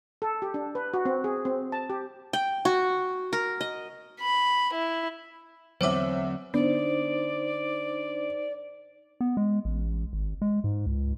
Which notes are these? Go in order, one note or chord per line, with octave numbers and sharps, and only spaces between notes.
A4
G4
D4
B4
F#4
C4
G#4
C4
A5
G4
G5
F#4
A#4
D#5
B5
E4
E2 D3 F#3 C4 C5 C#5 E5 D6
D3 B3 D#4 C5 D5
B3
G#3
A1
G#1
G#3
G#2
C#2